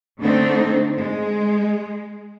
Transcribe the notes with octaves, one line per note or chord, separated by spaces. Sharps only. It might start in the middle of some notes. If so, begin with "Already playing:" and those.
D3 A3 C4 D4 D#4
G#3